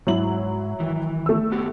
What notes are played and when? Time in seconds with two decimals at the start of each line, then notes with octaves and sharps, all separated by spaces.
0.07 G#2 F#3 E4 F#7
0.80 D#3 E3
1.26 A3 E6
1.52 B3 F#4 G4